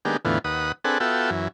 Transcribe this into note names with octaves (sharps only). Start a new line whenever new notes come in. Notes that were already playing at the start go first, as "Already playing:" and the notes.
D#3 G#3 A#3 B3 D4 G4
E2 A2 D3 E3 B3 F4
D#2 B4 F#5 D#6
C4 D4 G#4 A4 B4 F#5
B3 F4 F#4 A4 E5 G5
F#2 E3